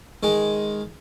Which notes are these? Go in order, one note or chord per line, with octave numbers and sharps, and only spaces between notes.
D#3 G#3